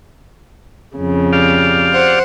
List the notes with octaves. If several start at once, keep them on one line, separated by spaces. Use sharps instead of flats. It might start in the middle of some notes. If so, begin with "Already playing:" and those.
F2 C#3
G4 D5 F5
C5 F#5